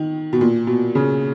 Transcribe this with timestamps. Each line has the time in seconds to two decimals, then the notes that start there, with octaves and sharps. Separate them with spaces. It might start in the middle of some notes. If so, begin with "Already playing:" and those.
Already playing: D#3
0.33 B2
0.41 A#2
0.67 B2
0.95 C#3